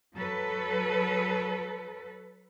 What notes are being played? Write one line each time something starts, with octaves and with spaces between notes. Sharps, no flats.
F#3 A4 B4